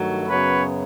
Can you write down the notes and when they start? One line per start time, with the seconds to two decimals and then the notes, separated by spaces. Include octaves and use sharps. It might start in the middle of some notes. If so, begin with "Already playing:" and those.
Already playing: G2 D#3 F#3 A3
0.28 F#2 C#3 F#3 B3 B4 C#5